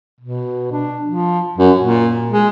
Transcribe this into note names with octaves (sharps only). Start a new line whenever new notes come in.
B2
D4
F3
F#2
A#2
G#3